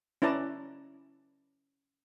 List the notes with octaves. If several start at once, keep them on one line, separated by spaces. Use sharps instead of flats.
C#4 E4 B4 D5 A5 A#5